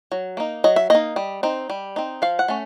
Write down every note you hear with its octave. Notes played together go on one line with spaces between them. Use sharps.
F#3
A#3 D#4
F#3 D#5
E5
A#3 D#4 D#5
G3
C4 D#4
G3
C4 D#4
F3 F5
F#5
A3 C#4